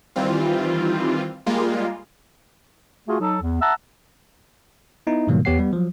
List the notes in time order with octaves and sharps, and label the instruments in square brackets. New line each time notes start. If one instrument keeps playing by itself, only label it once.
[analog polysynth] D#3 E3 G3 C4 F4
G3 G#3 A#3 F4
[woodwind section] A3 F4 F#4 G#4
F#3 D#4 A4
E2
E5 F#5 A5 A#5 E6
[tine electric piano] B3 D#4 E4
G#2 B2 D#3 F#3 G3 A#3
E2 B3 G4 C#5 F#5 C7
G3 B3 B4
F3 F#3